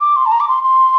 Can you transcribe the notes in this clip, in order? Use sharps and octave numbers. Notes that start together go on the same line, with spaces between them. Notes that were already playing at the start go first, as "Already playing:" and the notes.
D6
C6
A5
A#5
D6
C6
C6